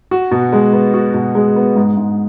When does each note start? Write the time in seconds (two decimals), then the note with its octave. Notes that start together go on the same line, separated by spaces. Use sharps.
0.11 F#4
0.31 B2
0.53 G#3
0.73 B3
0.94 F#4
1.14 B2
1.35 G#3
1.56 B3
1.76 G#2
1.97 G#2